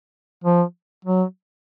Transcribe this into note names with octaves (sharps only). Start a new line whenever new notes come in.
F3
F#3